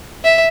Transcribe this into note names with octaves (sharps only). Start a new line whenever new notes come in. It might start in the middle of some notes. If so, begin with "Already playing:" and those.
E5